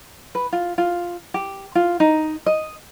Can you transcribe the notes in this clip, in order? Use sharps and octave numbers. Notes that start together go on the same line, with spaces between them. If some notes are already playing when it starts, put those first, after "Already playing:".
B4
F4
F4
G4
F4
D#4
D#5